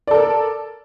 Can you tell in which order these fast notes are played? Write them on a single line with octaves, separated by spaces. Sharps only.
D5 A4 A#4